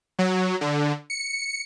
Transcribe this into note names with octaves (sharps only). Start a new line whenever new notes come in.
F#3
D3
C#7